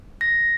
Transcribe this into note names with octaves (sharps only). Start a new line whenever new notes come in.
A#6